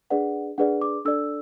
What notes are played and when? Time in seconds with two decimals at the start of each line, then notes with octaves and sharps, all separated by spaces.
0.10 D4 G#4 B4 D5 F#5
0.58 D4 G#4 B4 D5 F#5
0.82 D6
1.05 D4 A4 D5 E6